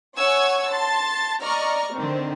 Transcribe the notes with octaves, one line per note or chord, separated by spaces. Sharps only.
C#5 F#5 G#5 C#6 E6 G#6
A5 C6 A6
D5 D#5 A#5 C#6 F6
D3 D#3 C4